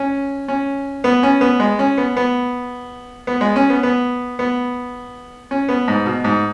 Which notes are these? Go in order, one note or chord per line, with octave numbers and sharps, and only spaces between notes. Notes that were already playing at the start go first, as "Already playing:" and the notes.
Already playing: C#4
C#4
B3
C#4
B3
G#3
C#4
B3
B3
B3
G#3
C#4
B3
B3
B3
C#4
B3
G#2
B2
G#2